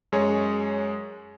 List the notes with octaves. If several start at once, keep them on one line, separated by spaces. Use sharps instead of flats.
F#2 G#3 G#4 C#5